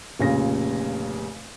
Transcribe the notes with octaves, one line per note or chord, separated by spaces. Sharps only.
F1 A#2 C#3 A#6